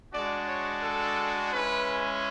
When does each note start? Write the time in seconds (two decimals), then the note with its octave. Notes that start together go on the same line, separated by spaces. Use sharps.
0.13 G#3 D4 F#4 D5
0.48 C#5
0.83 A4
1.53 G#3 C#4 E4 B4